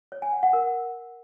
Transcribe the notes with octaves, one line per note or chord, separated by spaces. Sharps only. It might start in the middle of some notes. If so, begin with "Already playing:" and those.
C#5
G#5
F#5
F#5
A#4